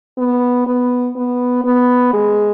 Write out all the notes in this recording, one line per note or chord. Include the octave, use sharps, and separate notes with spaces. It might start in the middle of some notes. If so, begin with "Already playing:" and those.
B3
B3
B3
B3
G#3